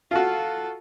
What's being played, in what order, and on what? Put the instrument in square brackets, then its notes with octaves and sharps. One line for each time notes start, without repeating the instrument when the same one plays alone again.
[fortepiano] F4 F#4 [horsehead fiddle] A4